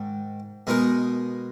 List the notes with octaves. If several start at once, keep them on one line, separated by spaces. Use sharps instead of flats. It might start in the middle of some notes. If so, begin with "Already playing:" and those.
Already playing: G#2 D#3
B2 G#3 D#4 A#4